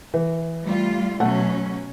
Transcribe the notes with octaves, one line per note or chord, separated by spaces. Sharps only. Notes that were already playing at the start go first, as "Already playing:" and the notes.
E3
G3 A3 F4
B2 F#3 A3 C#4 F#5